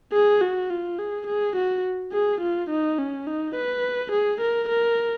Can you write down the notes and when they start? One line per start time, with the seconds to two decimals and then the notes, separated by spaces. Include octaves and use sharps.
0.13 G#4
0.41 F#4
0.70 F4
0.99 G#4
1.27 G#4
1.56 F#4
2.12 G#4
2.41 F4
2.70 D#4
2.98 C#4
3.27 D#4
3.55 B4
4.12 G#4
4.41 A#4
4.69 A#4